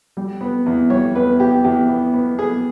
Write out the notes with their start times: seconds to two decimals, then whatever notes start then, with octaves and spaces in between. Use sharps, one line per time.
0.17 G3
0.41 B3
0.66 E2
0.90 G3 C#5
1.15 E2 B4
1.40 B3 G4
1.64 E2 G4
1.89 B3
2.14 B3
2.39 B3 G#4